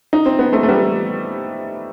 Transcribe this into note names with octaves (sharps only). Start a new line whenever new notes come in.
D#4
C4
B3
A3 C4
A3
G3 B3